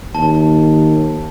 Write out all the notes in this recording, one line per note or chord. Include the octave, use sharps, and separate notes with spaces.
D#2 A5